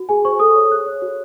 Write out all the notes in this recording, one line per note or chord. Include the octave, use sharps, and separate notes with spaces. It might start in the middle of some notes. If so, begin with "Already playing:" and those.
Already playing: F#4
G#4 G#5
C5 C#6
A4 D#6
C#5
G#4 F#6
C#5
F#4